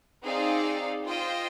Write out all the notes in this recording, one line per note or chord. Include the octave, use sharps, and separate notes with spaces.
C4 D#4 G#4 D5 F5
F4 C5 D#5 G5